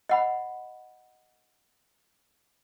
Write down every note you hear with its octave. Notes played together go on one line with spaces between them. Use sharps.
D#5 F#5 B5